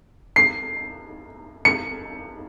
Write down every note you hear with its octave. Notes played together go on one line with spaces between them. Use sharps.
C7
C#7